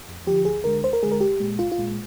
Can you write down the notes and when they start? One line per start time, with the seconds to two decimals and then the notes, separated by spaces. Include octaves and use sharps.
0.08 F2
0.27 D3 F3 G4
0.45 D2 G#4
0.64 D3 G#3 A#4
0.83 D2 C5
0.93 A#4
1.03 D3 G#3 G#4
1.12 A#4
1.20 C2 G4
1.40 A#2 G#3
1.59 C2 F4
1.72 F4
1.78 A#2 G#3